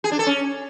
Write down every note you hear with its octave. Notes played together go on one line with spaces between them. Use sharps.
G#4
D4
A4
C#4